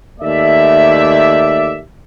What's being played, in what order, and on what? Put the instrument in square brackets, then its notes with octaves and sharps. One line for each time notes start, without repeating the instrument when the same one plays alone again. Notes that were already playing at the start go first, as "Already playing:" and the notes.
[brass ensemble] D#2 A3 D5 E5